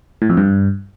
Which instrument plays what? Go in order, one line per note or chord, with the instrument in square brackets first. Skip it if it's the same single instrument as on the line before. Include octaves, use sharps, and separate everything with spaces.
[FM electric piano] A2
F2
G2